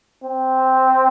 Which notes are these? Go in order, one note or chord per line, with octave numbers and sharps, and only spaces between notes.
C4